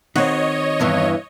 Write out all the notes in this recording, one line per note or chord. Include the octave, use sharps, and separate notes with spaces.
D#3 C4 F#4 C#5 D#5
E2 G2 E3